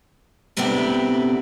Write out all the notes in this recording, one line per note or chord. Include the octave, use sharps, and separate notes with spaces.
D2 C3 B3 C4 E4 D5